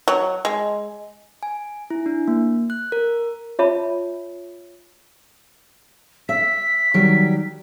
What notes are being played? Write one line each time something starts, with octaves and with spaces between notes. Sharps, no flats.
F#3
G#3
G#5
E4
D4
A#3
F#6
A#4
F4 C#5 E5 A5 B5
E5 B6
D#3 F#3 G3